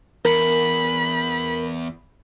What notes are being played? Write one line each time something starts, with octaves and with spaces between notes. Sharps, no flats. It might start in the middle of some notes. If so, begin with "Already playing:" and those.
E2 A#4 B5